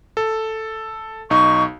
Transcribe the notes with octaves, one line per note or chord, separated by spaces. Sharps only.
A4
B1 D#4 C#6